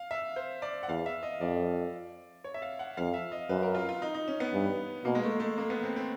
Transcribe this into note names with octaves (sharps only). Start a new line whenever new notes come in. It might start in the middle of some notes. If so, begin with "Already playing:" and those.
Already playing: F5
E5
C5
D5
F#5
E2 F5
E5
D#5
F2 D5
C#5
E5
F5
F#5
F2 F5
E5
D#5
F#2 B4
A#4
F4
F4
D#4
D#4
C#4
B3
G2
B2 A#3
G#3
A3
A3
A#3
B3
C4
C4